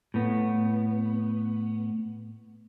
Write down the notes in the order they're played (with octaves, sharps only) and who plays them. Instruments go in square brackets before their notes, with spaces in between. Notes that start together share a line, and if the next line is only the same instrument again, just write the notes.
[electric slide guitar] A2 B3